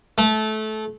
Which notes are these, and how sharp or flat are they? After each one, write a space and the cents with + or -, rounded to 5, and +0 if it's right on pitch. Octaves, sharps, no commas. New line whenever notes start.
A3 -20